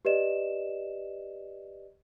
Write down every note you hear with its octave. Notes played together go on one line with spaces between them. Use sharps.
G4 B4 D5 D#5 E7